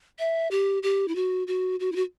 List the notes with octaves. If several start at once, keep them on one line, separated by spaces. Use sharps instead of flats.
E5
G4
G4
E4
F#4
F#4
F#4
E4
F#4